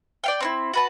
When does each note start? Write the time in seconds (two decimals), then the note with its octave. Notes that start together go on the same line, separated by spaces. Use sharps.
0.24 D5 F5 G5
0.40 C4 D4 E4
0.74 F#4 B4 A5